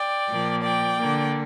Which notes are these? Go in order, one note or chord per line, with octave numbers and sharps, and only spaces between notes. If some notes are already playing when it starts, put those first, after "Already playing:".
Already playing: D5 G5
A#2 F3 A#3
D5 G5
D3 A#3